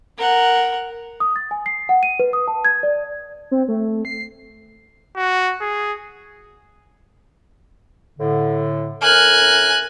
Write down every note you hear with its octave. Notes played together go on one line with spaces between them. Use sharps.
A#4 F#5
D#6
A6
G#5
C7
F#5
D#7
B4
D#6
A5
G#6
D5
C4
A3
C7
F#4
G#4
A2 D3
A2 A#4 G#5 F6 F#6